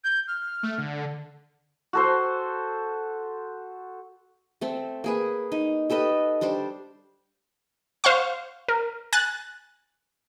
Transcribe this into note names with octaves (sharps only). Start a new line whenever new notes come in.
G6
F6
A3
D3
F#4 A4 C5
A3 C4 A4
A#3 G#4 B4
D#4
G4 A4 B4 D#5
G3 D4 C5 D5
C5 F5 F#5 C#6
A#4
G#5 F#6 A6